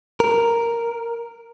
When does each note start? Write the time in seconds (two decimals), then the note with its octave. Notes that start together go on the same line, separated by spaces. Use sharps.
0.20 A#4